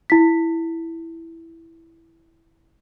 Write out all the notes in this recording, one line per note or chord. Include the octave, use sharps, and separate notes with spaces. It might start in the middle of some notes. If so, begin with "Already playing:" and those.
E4 B6